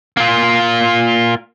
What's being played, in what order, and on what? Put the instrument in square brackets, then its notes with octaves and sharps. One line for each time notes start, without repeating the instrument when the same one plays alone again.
[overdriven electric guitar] A#3 F4